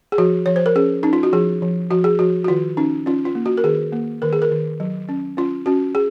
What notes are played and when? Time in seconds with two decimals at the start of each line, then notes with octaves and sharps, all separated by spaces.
0.12 G#4
0.18 F3 F#4
0.46 F3 C#5
0.56 C5
0.66 A#4
0.76 C#4 G#4
1.03 C#4 D#4
1.13 F4
1.23 F#4
1.33 F3 G#4
1.62 F3
1.91 F3 F#4
2.04 G#4
2.19 F3 F#4
2.44 F#4
2.48 D#3 F4
2.77 C#4 D#4
3.06 C#4 F4
3.25 F4
3.35 A#3
3.46 F#4
3.57 A#4
3.64 D#3 G#4
3.93 A#3
4.22 D#3 A#4
4.33 G#4
4.42 A#4
4.51 D#3
4.80 F#3
5.09 C#4
5.37 C#4 F4
5.66 C#4 F#4
5.95 G#4